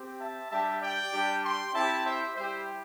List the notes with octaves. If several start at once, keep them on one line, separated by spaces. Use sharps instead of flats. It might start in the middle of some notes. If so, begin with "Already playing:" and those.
Already playing: C4 G4
E5 A5
G3 D4 G4 E5 A5
D5 G5
G3 D4 G4
G5 C6
C4 E4 G4 E5 A5
C5 E5
G3 E4 G4 C5 E5